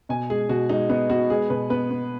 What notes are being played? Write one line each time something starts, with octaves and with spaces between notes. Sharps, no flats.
B2 G#5
G#3 G#4
B2 F#4
G#3 D#4
B3 D#4
B3 F#4
G#3 G#4
B2 B4
B3 B4
B3